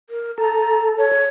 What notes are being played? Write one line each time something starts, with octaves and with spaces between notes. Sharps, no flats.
A#4
A4 A#5
C#5